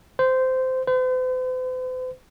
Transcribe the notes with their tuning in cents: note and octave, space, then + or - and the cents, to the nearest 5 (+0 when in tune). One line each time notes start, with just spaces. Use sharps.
C5 -15
C5 -45